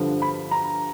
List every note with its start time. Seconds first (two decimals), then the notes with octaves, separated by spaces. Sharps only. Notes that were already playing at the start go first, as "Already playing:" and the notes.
Already playing: G2 D3 F3
0.22 B5
0.51 A#5